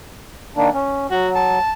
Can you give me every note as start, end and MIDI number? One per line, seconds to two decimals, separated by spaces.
0.57 0.70 51
0.57 0.70 58
0.57 0.70 62
0.74 1.07 61
1.11 1.59 54
1.11 1.28 66
1.35 1.73 81